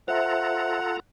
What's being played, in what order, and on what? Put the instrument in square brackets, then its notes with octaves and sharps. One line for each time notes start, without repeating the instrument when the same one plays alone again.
[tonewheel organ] F4 A4 A#5 [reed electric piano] C5 E5 [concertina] F#5